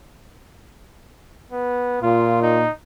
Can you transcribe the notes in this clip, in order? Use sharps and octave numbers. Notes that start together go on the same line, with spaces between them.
B3
A#2 F4
D#4